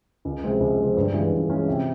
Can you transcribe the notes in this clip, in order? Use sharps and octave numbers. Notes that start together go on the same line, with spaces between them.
C#2
C3 F3 G#3 C4
C#2
C3 F3 G#3 C4
G2
E3 G#3 C#4 F4
G2
E3 G#3 C#4 F4
C3